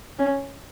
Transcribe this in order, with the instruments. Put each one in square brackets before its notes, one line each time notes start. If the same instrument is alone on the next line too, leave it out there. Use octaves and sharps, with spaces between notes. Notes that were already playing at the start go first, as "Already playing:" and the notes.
[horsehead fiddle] C#4